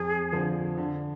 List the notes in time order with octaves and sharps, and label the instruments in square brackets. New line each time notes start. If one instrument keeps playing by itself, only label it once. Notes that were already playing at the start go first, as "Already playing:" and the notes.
Already playing: [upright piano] F2 [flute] G#4
[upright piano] D3 F3
D3